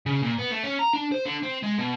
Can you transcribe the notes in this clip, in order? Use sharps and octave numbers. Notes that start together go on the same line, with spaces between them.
C#3
A#2
B3
A3
C#4
A#5
D4
C5
D3
C4
G#3
B2